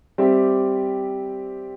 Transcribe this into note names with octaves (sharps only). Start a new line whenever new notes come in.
G3 C4 G4 E5